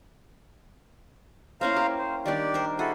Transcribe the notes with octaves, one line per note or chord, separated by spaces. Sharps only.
A#3 C#4 E4 C5 F5 A#5
G4
C5
D#3 G3 D4 G4 D5
A#4 C5
E4 F#4 G#4 A4